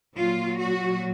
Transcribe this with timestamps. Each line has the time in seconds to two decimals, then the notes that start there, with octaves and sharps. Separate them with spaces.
0.15 A#2 F#3 F4
0.58 F#4